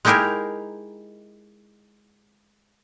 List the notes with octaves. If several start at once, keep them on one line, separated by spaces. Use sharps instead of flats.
G#3 D#4 E4 G4 G#4 A#4